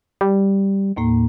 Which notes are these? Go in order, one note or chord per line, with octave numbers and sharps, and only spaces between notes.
G3
D#2 A2 A#3